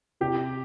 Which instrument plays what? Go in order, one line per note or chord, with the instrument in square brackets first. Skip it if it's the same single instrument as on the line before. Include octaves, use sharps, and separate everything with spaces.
[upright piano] C3 G4